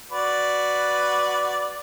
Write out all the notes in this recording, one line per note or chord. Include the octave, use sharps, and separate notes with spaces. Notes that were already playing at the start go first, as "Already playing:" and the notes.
F#4 B4 D5